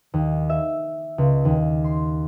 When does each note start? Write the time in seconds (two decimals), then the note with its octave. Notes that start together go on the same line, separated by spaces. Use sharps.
0.14 D#2
0.50 E5
1.18 C#2
1.45 D#2
1.84 C6